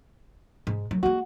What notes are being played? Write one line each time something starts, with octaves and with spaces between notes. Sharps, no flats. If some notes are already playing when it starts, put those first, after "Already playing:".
G#2
F#3
G#3 A#3 F#4